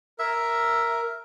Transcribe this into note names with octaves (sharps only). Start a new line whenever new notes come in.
A#4 E5